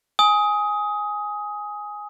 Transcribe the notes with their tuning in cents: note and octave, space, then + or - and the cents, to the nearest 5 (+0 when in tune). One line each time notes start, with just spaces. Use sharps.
G#5 +0 D#6 +15